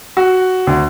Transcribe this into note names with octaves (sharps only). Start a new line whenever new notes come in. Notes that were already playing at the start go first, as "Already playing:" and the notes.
F#4
D2